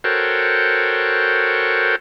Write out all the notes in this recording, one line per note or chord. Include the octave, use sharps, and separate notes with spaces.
F#4 A4 A#4 C5 C#5 G5